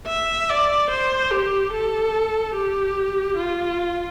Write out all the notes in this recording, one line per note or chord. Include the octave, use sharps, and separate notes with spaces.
E5
D5
C5
G4
A4
G4
F4